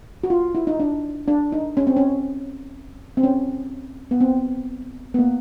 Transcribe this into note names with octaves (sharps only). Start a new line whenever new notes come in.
F#4
F4
E4
D#4
D4
D4
D#4
C#4
C4
C#4
C4
C#4
B3
C4
B3
A#3